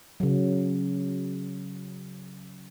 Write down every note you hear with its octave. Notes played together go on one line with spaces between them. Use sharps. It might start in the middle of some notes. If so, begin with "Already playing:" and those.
C#3 F#3